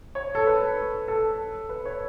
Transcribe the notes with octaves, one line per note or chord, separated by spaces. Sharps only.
C#5
A4
B4
A4
B4
C#5